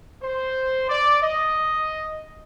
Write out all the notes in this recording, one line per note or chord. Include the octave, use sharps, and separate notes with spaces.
C5
D5
D#5